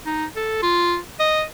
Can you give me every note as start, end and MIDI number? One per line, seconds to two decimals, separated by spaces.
0.06 0.25 63
0.36 0.60 69
0.63 0.97 65
1.20 1.43 75